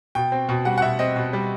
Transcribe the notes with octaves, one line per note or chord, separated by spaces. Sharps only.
B2 G5
C4
B2
G3 F#5
F#5
B2 E5
C4 D#5
B2
G3